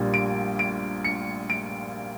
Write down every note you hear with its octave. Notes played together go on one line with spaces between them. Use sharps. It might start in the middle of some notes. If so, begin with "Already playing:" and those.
Already playing: A#1 A#2 G3
D7
D7
C#7
D7